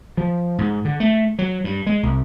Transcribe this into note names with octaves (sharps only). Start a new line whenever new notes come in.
F3
G#2
D3
A3
F#3
G2
G#3
C2